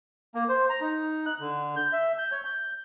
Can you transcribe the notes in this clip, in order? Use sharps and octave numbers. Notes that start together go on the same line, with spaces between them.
A#3
C5
A#5
D#4
F#6
D3
G6
E5
G6
C#5
G6